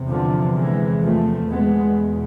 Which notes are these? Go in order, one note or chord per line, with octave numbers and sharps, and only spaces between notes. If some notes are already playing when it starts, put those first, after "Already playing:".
Already playing: E2 C3
D3 F3
E3 G#3
F3 A3
E2 B2 G#3 B3